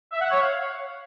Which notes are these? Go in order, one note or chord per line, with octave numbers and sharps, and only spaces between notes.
E5
F#5
C#5
F5